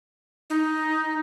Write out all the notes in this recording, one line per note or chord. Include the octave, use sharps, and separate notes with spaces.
D#4